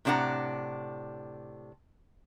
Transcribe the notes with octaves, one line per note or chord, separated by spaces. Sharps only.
A2 C3 D4 F4 F#5 A#5